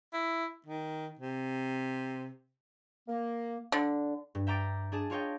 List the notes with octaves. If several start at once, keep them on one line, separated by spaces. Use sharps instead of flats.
E4
D#3
C3
A#3
D3
G2
E5 G5 A#5 D6 A6 D7
D4 G#4 A5 E7
D4 F4 C#5 D#5 G5